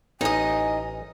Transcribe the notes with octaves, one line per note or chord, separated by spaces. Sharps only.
A1 D#4 D#5 G#5